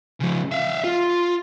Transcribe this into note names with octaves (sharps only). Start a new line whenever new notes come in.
C#3 F3
E5 F5
F4